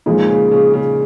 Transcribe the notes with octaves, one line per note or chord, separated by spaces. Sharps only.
A#2 F3 G#3 D#4
C#3
C#3
C#3